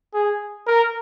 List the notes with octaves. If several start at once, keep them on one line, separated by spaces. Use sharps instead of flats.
G#4
A#4